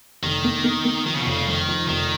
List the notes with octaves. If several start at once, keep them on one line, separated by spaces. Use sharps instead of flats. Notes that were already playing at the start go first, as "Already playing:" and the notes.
F1 D#3
A#3
A#3
A#3
D#3 F3
C#3
B2
F1 C#3
F2 D#3
F3
F1 D#3